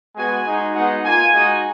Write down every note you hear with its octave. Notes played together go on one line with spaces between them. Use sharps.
G#3 B3 F#4 G#5
G#3 D#4 F#4
G#3 B3 D#4 F#4 F#5
A#3 F4 G#5
G#3 D#4 F#4